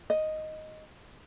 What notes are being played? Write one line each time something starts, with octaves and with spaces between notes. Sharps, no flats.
D#5